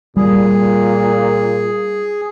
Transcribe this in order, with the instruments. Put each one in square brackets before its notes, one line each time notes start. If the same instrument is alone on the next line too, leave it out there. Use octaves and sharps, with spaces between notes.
[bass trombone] A#2 [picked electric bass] G3 [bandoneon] G#4